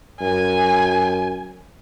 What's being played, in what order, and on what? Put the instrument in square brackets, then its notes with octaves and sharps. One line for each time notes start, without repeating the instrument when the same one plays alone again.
[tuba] F#2 [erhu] G#5